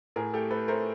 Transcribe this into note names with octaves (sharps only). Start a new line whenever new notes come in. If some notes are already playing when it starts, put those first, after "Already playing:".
A2 G#4 A#4
A3 G4 A4
A3 A4 B4
A3 A#4 C5